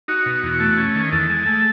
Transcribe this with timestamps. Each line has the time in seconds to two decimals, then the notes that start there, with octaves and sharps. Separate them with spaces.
0.08 D#4 F#4
0.26 B2
0.43 E2
0.60 A3
0.77 C#4
0.95 D#3
1.12 E2 A4
1.30 G#3
1.46 A3